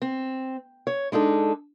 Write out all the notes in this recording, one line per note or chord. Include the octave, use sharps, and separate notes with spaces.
C4
C#5
G#3 D4 D#4 A4